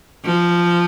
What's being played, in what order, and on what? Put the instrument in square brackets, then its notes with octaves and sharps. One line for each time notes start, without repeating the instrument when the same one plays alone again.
[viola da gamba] F3